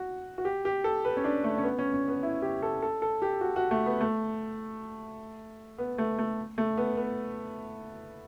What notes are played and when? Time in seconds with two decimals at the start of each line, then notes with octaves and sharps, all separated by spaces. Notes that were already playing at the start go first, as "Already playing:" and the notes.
Already playing: F#4
0.38 F#4
0.45 G4
0.65 G4
0.84 A4
1.05 B4
1.17 C#4
1.24 D4
1.44 A3
1.58 C#4
1.63 B3
1.79 C#4
1.94 C#4
2.08 B3
2.23 E4
2.42 G4
2.62 A4
2.82 A4
3.02 A4
3.22 G4
3.41 F#4
3.56 F#4
3.71 A3
3.86 B3
4.01 A3
5.78 B3
5.98 A3
6.18 A3
6.58 A3
6.77 B3
6.97 B3